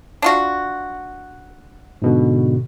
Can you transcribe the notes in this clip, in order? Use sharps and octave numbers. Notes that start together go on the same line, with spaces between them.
D4 F4 F#4
G#2 B2 D3